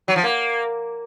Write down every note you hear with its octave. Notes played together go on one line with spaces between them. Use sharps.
F#3
F3
A#3